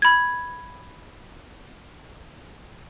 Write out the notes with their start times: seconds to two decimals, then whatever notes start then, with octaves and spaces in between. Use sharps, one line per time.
0.02 B5 G#6